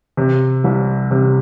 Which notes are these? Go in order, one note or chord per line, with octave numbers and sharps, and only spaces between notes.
C3
C2
C3